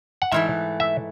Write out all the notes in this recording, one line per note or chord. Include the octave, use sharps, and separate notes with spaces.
F#5
G#2 E3 A3 E5
E5